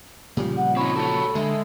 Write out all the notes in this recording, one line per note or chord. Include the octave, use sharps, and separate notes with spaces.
A#2 C#3 F3 G3
F#5
C4 D#4 C#5 B5
F#4 G4 A4 C#5
D3 G#3 E5